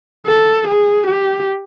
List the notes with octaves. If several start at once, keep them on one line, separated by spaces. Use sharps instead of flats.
A4
G#4
G4